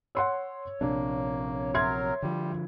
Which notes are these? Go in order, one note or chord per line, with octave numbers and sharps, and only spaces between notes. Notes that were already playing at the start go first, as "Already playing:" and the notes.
C#5 F#5 C6 E6
A#1 C3 A#3 D4
F#3 A#4 E5 C6 G#6
D3 F3 G3